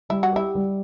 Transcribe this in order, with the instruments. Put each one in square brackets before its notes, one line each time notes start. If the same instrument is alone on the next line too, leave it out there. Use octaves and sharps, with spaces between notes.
[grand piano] G3 [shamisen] E4
[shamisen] F#4
[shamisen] E4 [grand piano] G4
[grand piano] G3